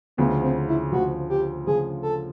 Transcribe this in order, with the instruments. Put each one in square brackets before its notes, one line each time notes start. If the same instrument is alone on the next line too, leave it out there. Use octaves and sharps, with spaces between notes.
[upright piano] D2 C#3 F3 [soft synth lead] B3
[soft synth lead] C4
E4
[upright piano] D2 C#3 F3 [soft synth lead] F#4
[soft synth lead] G4
[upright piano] D2 C#3 F3 [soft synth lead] G#4
[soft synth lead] A4